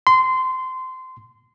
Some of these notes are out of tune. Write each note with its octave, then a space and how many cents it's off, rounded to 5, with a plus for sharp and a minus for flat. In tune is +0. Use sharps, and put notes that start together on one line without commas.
C6 -20